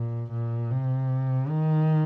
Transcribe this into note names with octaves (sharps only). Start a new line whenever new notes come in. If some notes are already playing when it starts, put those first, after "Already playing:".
Already playing: A#2
A#2
C3
D#3